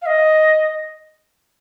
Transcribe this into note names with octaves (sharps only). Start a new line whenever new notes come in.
F5
D#5